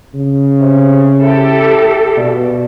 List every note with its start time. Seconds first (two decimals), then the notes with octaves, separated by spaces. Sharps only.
0.14 C#3
0.61 C3
1.22 E4 G4 A4
2.17 G2 B2